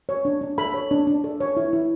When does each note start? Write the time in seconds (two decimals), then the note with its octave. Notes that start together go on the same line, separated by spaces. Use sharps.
0.09 C#5
0.25 D4
0.41 D4
0.58 A4 B5
0.74 C#5
0.91 D4
1.07 D4
1.24 A4
1.40 C#5
1.57 E4
1.73 E4